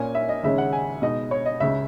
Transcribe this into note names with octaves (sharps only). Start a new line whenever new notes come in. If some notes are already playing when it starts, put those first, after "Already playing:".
Already playing: A#2 A#3 C#4 G#5
E5
D#5
D#2 C#3 G#3 C#4 E5
F#5
G#5
B2 G#3 D#4 D#5
C#5
D#5
C#2 C#3 G#3 E5